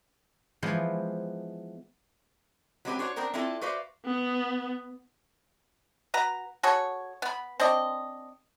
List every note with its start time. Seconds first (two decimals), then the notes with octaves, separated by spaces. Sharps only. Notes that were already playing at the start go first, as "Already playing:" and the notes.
0.62 E3 F3 G#3 B3 C5
2.85 F#3 G#3 C4 G4 B4 G#5
2.99 D4 F#4 C5 C#5
3.16 B3 D4 A#4 C5 G5
3.34 C4 D4 E4 F4 A4
3.61 F#4 B4 C5 D5 E5 F5
4.06 B3
6.14 F#4 B4 A#5
6.63 F#4 G#4 A4 C#5
7.22 B3 B5
7.60 C4 D4 D#5